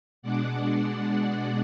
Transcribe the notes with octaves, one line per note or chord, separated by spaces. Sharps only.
B2 G#3 D4 D5 F#5